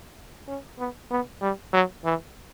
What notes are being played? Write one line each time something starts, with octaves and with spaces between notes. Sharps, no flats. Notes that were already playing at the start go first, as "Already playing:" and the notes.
C#4
B3
B3
G3
F#3
E3